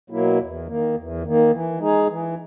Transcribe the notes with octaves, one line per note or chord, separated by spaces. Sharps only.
B2 F#3 A#3 E4
E2
D#3 A#3
E2
D#3 A#3
E3
G#3 D#4 G#4
E3